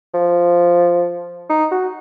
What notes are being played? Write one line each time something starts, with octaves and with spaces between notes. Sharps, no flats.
F3
D#4
F#4